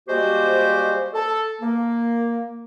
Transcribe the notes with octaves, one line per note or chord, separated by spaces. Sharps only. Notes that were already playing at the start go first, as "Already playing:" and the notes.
G3 G#3 A#3 F#4 G4 C5
A4
A#3